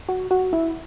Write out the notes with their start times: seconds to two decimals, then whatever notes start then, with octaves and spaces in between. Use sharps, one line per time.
0.09 F#4
0.31 F#4
0.53 E4